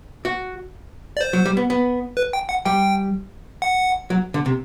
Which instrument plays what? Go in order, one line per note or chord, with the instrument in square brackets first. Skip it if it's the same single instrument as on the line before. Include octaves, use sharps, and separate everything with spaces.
[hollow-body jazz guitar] F#4
[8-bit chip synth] D5
C5
[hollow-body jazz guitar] F#3
G3
B3
B3
[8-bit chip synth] B4
G5
F#5
[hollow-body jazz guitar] G3 [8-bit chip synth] G5
[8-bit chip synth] F#5
[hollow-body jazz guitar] F#3
D3
C3